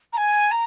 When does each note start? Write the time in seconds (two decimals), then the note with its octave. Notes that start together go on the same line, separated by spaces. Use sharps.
0.13 A#5
0.17 G#5
0.51 A#5